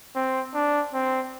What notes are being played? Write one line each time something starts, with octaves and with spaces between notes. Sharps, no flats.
C4
D4
C4